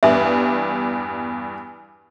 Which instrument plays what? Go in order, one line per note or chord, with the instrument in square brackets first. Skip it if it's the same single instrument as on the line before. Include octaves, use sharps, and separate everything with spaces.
[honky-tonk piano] E2 G2 [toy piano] E5